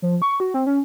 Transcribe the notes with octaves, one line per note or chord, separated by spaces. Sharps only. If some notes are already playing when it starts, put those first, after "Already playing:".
F3
C#6
F#4
C4
C#4